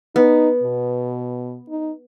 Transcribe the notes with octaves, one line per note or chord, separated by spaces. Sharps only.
B3 D#4
B2
D#4